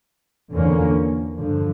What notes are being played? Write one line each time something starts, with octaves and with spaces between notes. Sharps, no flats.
E2 D3 F3 A#3 C#4
G2 D3 F3